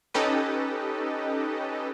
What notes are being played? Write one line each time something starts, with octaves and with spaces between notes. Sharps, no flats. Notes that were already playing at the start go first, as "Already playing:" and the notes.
C#4 D#4 G4 A4 B4 D#5